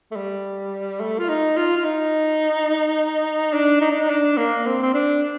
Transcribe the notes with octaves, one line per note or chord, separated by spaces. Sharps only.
A3
G3
A3
F4
D#4
F4
F4
D#4
D4
D#4
D4
D#4
D4
A#3
C4
C4
D4